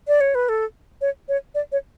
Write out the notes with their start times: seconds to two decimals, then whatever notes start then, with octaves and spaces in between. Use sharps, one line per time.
0.08 D5
0.21 C#5
0.35 B4
0.49 A4
1.01 C#5
1.29 C#5
1.55 D5
1.72 C#5